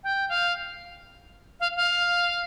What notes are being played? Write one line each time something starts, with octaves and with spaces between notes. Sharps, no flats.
G5
F5
F5
F5